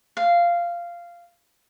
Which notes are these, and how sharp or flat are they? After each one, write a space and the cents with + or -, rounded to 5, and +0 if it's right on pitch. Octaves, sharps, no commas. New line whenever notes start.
F5 -10